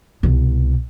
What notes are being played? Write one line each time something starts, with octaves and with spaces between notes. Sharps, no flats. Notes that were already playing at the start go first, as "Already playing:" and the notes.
C2 B2